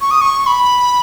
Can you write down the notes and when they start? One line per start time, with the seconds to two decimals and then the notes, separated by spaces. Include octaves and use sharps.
0.01 C#6
0.11 D#6
0.21 C#6
0.47 B5